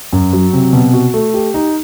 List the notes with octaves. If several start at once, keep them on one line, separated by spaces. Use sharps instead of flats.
F#2
F#3
C3
B2
F#4
A3
G4
D#4